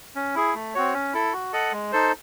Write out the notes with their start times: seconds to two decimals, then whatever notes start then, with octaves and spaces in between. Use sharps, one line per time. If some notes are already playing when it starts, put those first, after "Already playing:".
0.16 C#4
0.35 E4 G#4
0.55 A3
0.75 C4 F#4 C#5
0.94 C#4
1.13 E4 A4
1.33 F#4
1.53 A4 D#5 F#5
1.72 G#3
1.92 D#4 A4 C5